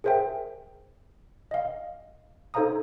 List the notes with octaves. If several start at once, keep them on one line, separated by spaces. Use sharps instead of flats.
G#4 A#4 C5 E5 G5
D#5 F5
D#4 A4 C5 F5 A#5 D#6